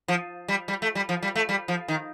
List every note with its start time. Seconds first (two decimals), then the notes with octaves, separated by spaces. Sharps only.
0.08 F3
0.48 G3
0.68 G3
0.82 A3
0.95 G3
1.09 F3
1.22 G3
1.36 A3
1.49 G3
1.68 F3
1.88 D#3